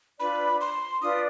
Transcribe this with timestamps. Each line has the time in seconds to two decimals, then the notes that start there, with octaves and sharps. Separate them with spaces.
0.19 D4 F4 B4 D5 B5
0.61 C6
1.02 D4 F4 B4 D5 D#6